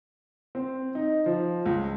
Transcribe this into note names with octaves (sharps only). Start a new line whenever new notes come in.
C4
D#4
F3
C#2